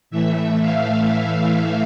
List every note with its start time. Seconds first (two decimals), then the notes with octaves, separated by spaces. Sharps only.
0.10 A2 E3 A3 E5
0.60 F5